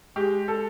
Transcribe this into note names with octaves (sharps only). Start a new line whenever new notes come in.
G#3 G4
A4